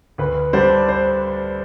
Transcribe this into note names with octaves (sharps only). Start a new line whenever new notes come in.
D2 B4
D3 G3 D4 C5
C5